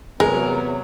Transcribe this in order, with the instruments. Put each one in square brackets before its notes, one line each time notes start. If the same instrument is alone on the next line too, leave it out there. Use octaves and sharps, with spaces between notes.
[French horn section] E2 B3 [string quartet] C3 F#3 [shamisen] G#3 [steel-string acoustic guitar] A#4